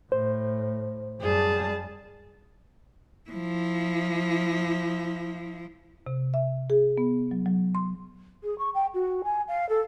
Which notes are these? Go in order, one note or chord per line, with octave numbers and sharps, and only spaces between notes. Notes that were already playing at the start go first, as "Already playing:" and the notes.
A2 C5
F#2 G3 G#4 A5
F3 E4
C3
E5
G#4
B3
F#3
F#3
C6
G#4
C#6
G5
F#4
G#5
F5
A4